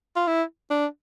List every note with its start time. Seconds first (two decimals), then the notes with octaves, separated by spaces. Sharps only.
0.16 F4
0.28 E4
0.70 D4